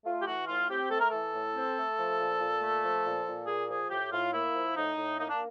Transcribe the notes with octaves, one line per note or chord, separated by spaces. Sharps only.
A3 F4
G4
E3 F#4
A2 F4
C4 G4
A3 A4
A#4
E3 A4
A2
C4
A3
F3
A#2
A#2
A3
F3
A#2
A#2
A#3 G#4
F3 G#4
A2 G4
A2 F4
A#3 E4
F3
A2 D#4
A2
A#3 D#4
D4